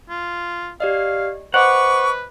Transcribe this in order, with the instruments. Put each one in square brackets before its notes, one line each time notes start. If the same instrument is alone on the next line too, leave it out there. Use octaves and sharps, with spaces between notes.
[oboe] F4
[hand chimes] G4 D5 D#5 [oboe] F5
[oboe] B4 [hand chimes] C5 D#5 D6 [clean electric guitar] F#5 [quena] C#6